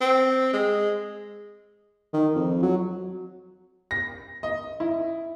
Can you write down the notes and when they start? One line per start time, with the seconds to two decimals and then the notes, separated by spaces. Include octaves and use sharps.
0.01 C4
0.53 G#3
2.14 D#3
2.35 F2
2.62 F#3
3.91 A#6
4.43 D#5
4.80 E4